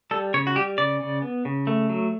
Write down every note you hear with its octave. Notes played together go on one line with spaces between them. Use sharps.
G3 A4
C#3 C#5
F#4
G3 G4
C#3 D5
C#3
B3
C#3
A3
F#3